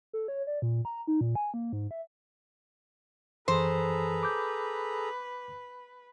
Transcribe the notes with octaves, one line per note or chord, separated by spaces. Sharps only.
A4
C#5
D5
A#2
A#5
D#4
A#2
G#5
A#3
G#2
E5
F#2 E3 G#4 A4 B4 C5 A#5
D6 G6